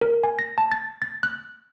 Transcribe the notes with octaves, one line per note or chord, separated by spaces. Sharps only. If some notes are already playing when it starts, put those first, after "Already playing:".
A#4
G#5
A#6
A5
A6
A6
F#6